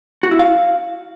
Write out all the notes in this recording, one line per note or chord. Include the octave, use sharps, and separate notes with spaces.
F#4
E4
F5